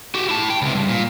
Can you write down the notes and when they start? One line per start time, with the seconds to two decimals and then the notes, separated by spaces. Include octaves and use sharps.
0.15 F#4 G4
0.29 E4 A5
0.50 G5
0.62 C#2 C3
0.75 G2
0.89 A#2